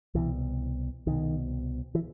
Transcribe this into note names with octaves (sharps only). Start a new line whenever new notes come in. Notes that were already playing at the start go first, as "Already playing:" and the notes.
C2 B2 E3
C2 B2 D#3
E3